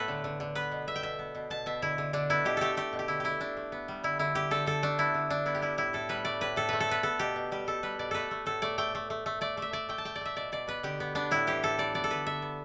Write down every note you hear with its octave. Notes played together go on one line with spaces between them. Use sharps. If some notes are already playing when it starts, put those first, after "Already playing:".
Already playing: A2 A3 B3 A4 B4
D3
D3
D3
B3 B4
B2
B2 E5
G5
B2 E5
B3
B2
B2 A5
B2 E5
D3 E4
D3
D3 D4
B3 E4
B2 G4
A3 G4 A4
A3 G4
B2
G4
D3 E4
A3 E4 G4
A3 D4
A3
B3
G3
D3 E4
D3 E4
D3 G4
D3 A4
D3 A4
A3 D4
B3 E4
D3
D3 D4
B3 E4
G4
G3 E4
A2 E4
A2 A4
G3 B4
A3 D5
A2 B4
A2 A4
A3 B4
A4
B3 B4
B3 A4
B2 G4
B2
G3 G4
B2 A4
G3 B4
B2 D5
A3 A4 B4
A3
A2 A4
A3 D5
A3 G5
A3
A3
A3
A3 D5
A3 E5
A3 D5
A3 G5
A5
A3 G5
D5
A3 E5
B2 D5
B2 D5
B3 B4
D3 G4
B3
B3 D4
A2 E4
E3 G4
A2 A4
E3 D5
B3 D5
A4
D3 B4
D3 E5
B3